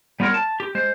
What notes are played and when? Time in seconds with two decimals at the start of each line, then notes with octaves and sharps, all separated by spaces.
0.20 G3 B3 F4 A#4 C#5
0.34 A5
0.60 G4
0.75 G#3 C5